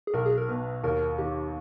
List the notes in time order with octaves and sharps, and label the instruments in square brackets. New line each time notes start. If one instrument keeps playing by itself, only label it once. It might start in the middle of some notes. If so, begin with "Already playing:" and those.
[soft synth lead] G#4
[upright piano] B1 [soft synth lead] A#4
[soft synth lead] G#4
A#4
[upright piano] B2 [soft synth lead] B4
[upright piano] D#2 [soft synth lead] A#4
[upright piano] D#3 [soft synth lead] G4